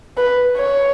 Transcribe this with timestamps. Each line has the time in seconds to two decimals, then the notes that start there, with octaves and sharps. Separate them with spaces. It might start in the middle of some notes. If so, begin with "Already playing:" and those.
0.17 B4
0.56 C#5